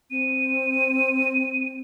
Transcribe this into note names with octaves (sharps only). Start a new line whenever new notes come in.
C4 D#7